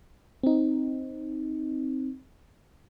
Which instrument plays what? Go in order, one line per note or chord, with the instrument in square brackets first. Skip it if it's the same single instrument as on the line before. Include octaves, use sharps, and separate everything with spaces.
[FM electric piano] C4 D#4